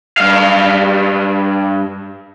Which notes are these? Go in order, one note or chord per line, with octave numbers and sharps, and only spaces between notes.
G2 F5